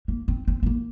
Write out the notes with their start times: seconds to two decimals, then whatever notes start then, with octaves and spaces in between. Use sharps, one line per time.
0.08 A#3
0.28 C4
0.48 C4
0.63 C4
0.66 A#3